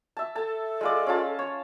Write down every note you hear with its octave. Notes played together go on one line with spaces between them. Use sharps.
E5 A5
A4 A5
G#3 F4 D5
C#4 F4 A5
C#5